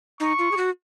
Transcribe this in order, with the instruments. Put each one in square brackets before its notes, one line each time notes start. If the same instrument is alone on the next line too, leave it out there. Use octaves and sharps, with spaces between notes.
[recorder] D#4 [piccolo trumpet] C#6
[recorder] F4
G#4
F#4